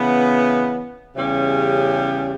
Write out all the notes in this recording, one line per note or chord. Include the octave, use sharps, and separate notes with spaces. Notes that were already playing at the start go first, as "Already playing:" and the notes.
Already playing: C#3 E3 B3
E2 C#3 G3 C#4 G4